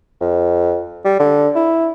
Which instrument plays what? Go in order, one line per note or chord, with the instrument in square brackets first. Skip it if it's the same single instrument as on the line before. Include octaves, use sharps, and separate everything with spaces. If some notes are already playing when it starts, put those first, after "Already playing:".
[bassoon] F2
G3
D3
E4